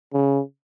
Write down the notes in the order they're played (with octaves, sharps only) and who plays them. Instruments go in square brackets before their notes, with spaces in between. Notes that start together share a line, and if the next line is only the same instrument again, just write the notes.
[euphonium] C#3